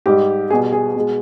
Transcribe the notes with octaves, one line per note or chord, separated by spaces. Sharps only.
G#2 G3 G4
B2 G3 G#4
G#4
B2 G#3